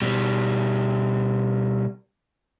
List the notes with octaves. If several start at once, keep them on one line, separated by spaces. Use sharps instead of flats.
B2 G3